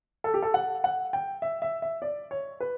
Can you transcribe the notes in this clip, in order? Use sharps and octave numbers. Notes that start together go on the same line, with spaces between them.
A4
G4
A4
F#5
F#5
G5
E5
E5
E5
D5
C#5
B4